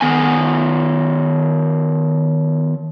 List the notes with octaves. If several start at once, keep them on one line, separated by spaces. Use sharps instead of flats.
D#3 B3 G#5